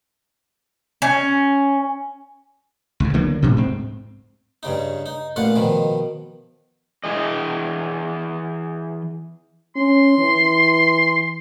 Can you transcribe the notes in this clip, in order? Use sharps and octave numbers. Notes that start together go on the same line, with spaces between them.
C#4
C#2 A2
D3 F#3 A#3 B3
A2 C3
G#2 C4
G2 C#3 D#4
D#4
A1 A#2 F4 F#5
B2 D#3 F3
E3 G#4 D#5
C#4 C6
E3